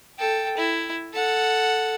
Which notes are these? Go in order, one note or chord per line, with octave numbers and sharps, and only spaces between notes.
A4 G5
E4
A4 F#5